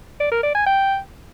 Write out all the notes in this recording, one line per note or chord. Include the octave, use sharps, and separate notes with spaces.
D5
A#4
D5
G#5
G5